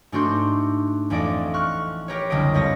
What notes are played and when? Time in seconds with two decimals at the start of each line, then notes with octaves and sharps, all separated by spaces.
0.12 G#2 A3 D4 F#4 C6 G6
1.10 A1 F2 A3 D5 D#5 D7
1.54 C#6 F6 F#6
2.08 G4 A#4 B4 C#5
2.30 F#1 C2 D3 C4 D#5 D7
2.54 F2 G3 C#5 D#5 A#6